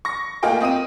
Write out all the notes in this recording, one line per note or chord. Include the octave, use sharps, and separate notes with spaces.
C#6 A#6
A3 A#3 F4 D#5 G5 G#5
C4 D#5 D#6 D#7